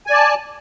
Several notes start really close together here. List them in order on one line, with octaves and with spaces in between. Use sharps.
G#5 D5 A5